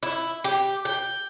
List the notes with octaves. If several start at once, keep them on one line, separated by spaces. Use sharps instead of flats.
E4
G4
G5